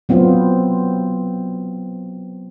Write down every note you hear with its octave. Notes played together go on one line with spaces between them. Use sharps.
F#3 B3 C4 F4